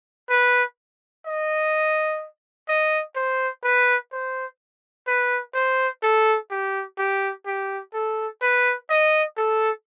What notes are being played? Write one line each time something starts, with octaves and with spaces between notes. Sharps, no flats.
B4
D#5
D#5
C5
B4
C5
B4
C5
A4
G4
G4
G4
A4
B4
D#5
A4